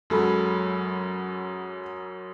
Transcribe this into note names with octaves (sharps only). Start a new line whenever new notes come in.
F#2 F#3 G#3 A4 B5